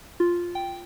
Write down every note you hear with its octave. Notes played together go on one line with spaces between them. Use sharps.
F4
G5